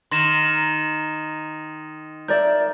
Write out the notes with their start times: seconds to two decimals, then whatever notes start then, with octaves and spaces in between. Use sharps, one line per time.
0.12 D#3 C6 A#6 E7
2.28 A#4 D5 E5 G6